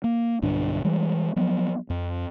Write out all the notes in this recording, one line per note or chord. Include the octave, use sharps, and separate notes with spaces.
A#3
B1 G2 D3 D4
E3 G3 G#3
F3 F#3 B3
F2